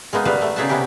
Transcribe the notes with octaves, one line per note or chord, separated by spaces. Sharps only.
G#3 A#3 B3 D#4
G3 A3 B3 B4 F5
A3
C#3 D#4 G#4 E5 F#5 A5
C3 B3 C#4 E4 G4